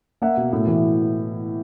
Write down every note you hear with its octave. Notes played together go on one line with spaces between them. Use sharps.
A#3 E5 F#5
B2
A2
E3